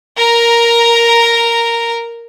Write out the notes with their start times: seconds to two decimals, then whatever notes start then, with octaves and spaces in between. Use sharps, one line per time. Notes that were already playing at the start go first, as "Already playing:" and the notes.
0.17 A#4 A#5